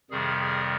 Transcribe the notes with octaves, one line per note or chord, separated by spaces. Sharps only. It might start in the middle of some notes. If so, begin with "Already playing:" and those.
F2 C3 D#3 G3 G#4
G#4